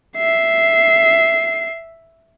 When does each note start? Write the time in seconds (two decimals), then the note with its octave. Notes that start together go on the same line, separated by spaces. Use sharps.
0.17 E5 C7